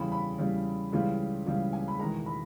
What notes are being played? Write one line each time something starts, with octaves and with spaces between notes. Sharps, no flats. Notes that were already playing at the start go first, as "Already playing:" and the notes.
Already playing: E2 C#3 G3 B5
B5
E2 C#3 G3
C#2 C#3 E3 G3
C#2 C#3 E3 G3
G#5
B5
E1 E2 D#3 G#3 A#5
B5